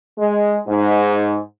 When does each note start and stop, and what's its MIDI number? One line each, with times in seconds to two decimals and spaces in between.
0.18 0.55 56
0.67 1.36 44